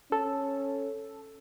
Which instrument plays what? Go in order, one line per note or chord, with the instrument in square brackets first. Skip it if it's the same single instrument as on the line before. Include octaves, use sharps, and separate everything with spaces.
[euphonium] C#4 [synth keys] A4